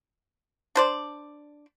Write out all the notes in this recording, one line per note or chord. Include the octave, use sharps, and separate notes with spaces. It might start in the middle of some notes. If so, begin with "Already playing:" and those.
D4 C5 D5